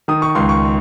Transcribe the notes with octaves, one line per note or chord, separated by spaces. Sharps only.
D#3 D#6
C#6
C#2 C6
C#6